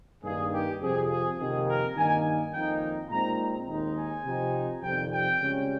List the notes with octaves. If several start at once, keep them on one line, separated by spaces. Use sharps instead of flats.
G2 D#3 A#3 G#4
G4
F2 C3 F3 C4 G#4
G#4
F2 C3 D#3 A#3 G#4
A#4
G2 D#3 A#3 D#4 G#5
F2 D#3 A#3 D#4 G5
A#2 G#3 C4 D#4 A#5
D#2 D#3 G#3 D#4
G#5
C3 F3 C4 D#4
F2 C3 D#3 G3 G5
G5
C#2 C#3 G3 C#4